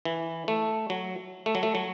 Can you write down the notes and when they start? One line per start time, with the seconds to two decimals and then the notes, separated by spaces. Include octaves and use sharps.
0.05 E3
0.48 A3
0.90 F#3
1.46 A3
1.55 F#3
1.63 A3
1.75 F#3